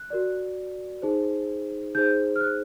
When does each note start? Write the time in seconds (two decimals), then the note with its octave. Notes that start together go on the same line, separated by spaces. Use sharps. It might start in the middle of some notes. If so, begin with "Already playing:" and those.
Already playing: F#6
0.10 F#4 A#4 D5
1.02 D#4 G#4 C5
1.95 D#4 G#4 C5 G6
2.36 F6
2.41 F#6